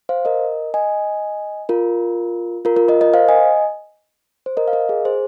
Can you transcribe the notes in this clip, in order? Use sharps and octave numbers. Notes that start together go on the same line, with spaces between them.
C5 F5
A#4 D#5
D#5 G#5
F4 A#4
F4 A#4
F4 A#4
A#4 D#5
A#4 D#5
C5 F5
D#5 G#5
C5
A#4 D#5
F5
A#4 D#5
G#4
G#4 C5